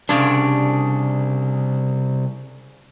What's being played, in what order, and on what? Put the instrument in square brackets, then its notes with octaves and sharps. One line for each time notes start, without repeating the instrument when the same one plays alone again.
[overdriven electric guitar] C2 F2 [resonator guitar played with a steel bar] C#3 D4